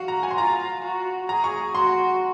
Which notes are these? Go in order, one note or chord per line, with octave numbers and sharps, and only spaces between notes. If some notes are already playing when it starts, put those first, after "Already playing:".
Already playing: F#4 F5 F#5
A#5
G#5
C6
F4 A#5
F#4
G#4 A#5
C#6
F#4 C6